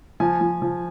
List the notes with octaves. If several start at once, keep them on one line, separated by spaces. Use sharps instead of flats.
F3 G#5
F3
F3